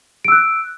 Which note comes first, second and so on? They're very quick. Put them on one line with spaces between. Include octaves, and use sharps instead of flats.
D7 E6 F#6